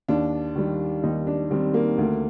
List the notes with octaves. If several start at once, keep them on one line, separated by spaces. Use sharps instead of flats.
D#2 D4
D#3 G3
D#2 D#4
D4
D#3 G3 C4
A#3
D2